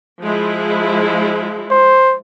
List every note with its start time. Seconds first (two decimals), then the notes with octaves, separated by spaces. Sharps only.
0.21 F3 G#3 E4
1.71 C5